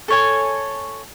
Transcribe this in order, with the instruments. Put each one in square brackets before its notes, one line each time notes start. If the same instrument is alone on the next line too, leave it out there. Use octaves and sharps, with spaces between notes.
[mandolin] A4 C#5 G#5